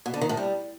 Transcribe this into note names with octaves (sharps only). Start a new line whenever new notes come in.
B2
D3
D#3
A2
G3